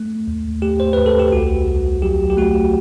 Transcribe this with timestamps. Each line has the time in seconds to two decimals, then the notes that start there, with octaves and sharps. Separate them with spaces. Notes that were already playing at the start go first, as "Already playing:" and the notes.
Already playing: A3
0.27 D#2
0.62 A3 G4
0.80 C5
0.93 D#2 B4
1.06 A4
1.19 G4
1.32 C2 F#4
1.68 C2
2.02 F#3 G4
2.30 G4
2.37 A3 F#4